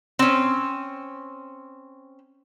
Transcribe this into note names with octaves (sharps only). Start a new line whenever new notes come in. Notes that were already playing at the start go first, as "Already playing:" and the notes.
C4 C#4